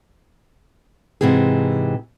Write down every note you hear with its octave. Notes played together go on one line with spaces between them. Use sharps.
G#2 C3 E3 F#4 G#4